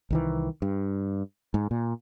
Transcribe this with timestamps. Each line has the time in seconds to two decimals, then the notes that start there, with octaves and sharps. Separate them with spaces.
0.10 C2 D#3 E3
0.62 G2
1.54 G#2
1.71 A#2